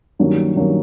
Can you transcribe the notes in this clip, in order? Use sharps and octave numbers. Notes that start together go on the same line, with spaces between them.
G2 D#3 F#3 A#3 C#4
G2 D#3 F#3 A#3 C#4